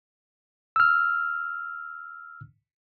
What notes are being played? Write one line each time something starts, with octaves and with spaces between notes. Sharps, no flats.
E6 F6